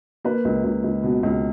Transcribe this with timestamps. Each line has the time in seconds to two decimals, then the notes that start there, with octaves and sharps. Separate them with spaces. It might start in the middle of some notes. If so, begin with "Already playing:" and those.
0.25 A#3 B4
0.45 C#2
0.64 C#2
0.84 C#2
1.03 B2
1.23 C#2